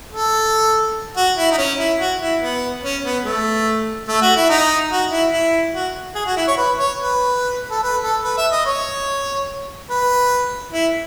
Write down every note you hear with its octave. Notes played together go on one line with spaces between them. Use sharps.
A4
F#4
E4
D#4
C#4
E4
F#4
E4
B3
C#4
B3
A3
A3
F#4
E4
D#4
F#4
E4
E4
F#4
G#4
F#4
E4
C#5
B4
C#5
B4
A4
B4
A4
B4
E5
D#5
C#5
B4
E4